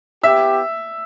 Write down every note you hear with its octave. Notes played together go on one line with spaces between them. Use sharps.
B3 E4 G4 E5 E6